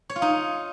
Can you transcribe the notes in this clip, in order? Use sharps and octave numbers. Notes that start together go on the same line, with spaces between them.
C#5
F4
D#4